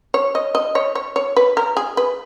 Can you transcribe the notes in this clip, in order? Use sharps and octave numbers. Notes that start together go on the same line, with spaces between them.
C#5
D#5
D#5
C#5
C#5
C#5
B4
A#4
G#4
B4